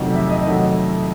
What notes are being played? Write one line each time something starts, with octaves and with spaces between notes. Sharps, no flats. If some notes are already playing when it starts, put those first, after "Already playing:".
Already playing: F2 C3 D#3 F#3 A3
E5
D#5
C3 D#3 F#3 A3 D#5